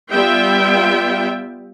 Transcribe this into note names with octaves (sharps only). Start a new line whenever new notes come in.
G3 B3 F4 E5 G5